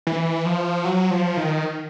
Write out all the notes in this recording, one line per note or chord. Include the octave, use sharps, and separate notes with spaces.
E3
F3
F#3
F3
D#3